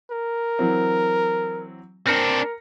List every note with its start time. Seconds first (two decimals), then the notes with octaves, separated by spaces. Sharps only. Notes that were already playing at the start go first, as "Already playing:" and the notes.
0.11 A#4
0.59 E3 F#3 C4
2.07 C4 D4 A#4 F6 A#6 C#7